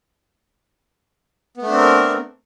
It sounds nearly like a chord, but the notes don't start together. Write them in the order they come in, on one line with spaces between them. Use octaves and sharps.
B3 A3 D4 C4 A#4